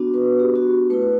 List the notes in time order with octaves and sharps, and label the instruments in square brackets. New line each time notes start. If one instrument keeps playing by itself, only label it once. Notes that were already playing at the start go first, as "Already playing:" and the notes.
Already playing: [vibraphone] B3 D4 F#4
B4
G4
F#4
A3 E4 B4